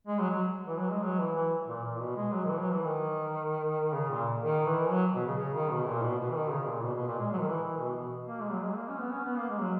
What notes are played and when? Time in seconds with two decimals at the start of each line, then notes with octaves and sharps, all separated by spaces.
0.07 G#3
0.20 F#3
0.30 F#3
0.67 E3
0.79 F#3
0.91 G#3
1.03 F#3
1.19 E3
1.36 E3
1.68 A#2
1.84 A#2
1.99 B2
2.16 G#3
2.33 F#3
2.45 D#3
2.49 E3
2.60 F#3
2.72 E3
2.85 D#3
3.93 C#3
4.09 A#2
4.42 D#3
4.65 E3
4.90 F#3
5.14 B2
5.27 C#3
5.38 C#3
5.54 D#3
5.70 B2
5.87 A#2
6.03 B2
6.18 B2
6.30 E3
6.35 D#3
6.51 C#3
6.66 A#2
6.83 B2
6.95 B2
7.07 A#2
7.19 G#3
7.32 F#3
7.39 D#3
7.48 E3
7.64 E3
7.79 B2
7.96 B2
8.27 A#3
8.40 G#3
8.52 F#3
8.64 G#3
8.76 A#3
8.88 C#4
9.01 B3
9.12 C#4
9.25 B3
9.37 A#3
9.49 G#3
9.61 F#3